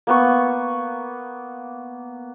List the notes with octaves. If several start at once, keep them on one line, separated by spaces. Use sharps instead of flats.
A#3 B3 C#6